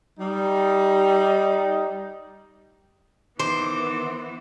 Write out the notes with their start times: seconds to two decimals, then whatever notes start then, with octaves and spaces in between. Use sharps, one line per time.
0.20 G3 D#4
3.40 D#3 E3 B3 C5 D6